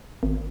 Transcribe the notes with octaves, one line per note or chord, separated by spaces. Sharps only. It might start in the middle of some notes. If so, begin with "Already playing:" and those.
G#1